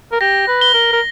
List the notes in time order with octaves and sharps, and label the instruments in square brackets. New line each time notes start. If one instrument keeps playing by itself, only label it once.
[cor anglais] A#4
[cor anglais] G4 [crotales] A#6
[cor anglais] B4
[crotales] G7
[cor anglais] A#4
A#4